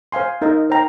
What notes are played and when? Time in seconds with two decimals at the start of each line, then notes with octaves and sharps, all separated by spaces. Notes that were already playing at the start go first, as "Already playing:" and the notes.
0.12 C5 F5 G#5 C6
0.42 D#4 A#4 D#5
0.70 C5 G5 A#5